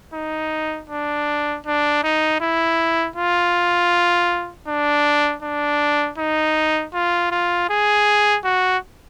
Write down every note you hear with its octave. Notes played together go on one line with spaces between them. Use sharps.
D#4
D4
D4
D#4
E4
F4
D4
D4
D#4
F4
F4
G#4
F#4